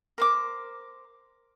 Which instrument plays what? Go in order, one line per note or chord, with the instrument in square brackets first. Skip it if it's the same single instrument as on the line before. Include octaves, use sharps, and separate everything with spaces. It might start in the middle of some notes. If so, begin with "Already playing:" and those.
[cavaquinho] A#4 C5 D6